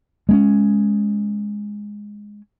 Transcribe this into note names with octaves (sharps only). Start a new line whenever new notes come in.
G#3 A#3 C#4